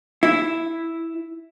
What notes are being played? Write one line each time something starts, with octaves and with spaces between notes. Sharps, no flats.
E4